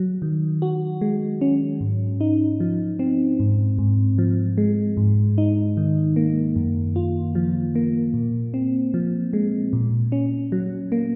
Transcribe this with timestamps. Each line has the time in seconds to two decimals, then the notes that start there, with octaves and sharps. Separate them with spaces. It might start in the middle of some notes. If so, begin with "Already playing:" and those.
Already playing: F#3
0.22 D#3
0.62 F#4
1.01 G#3
1.41 C#4
1.81 G#2
2.21 D#4
2.60 F3
2.99 C4
3.40 G#2
3.78 G#2
4.18 F3
4.58 G#3
4.97 G#2
5.38 D#4
5.77 D#3
6.16 A#3
6.56 F#2
6.96 F4
7.35 F3
7.75 A#3
8.14 A#2
8.54 C4
8.94 F3
9.33 G#3
9.73 A#2
10.12 C#4
10.52 F#3
10.92 A#3